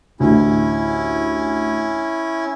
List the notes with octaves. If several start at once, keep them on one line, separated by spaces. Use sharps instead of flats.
A1 D2 C#4 E4